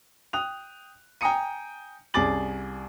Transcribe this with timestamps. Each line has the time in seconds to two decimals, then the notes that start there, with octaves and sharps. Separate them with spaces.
0.33 G5 D#6 F#6 F7
1.21 G5 G#5 A#5 D#6 C#7 D#7
2.14 C2 C#4 G#4 D6 A6 F#7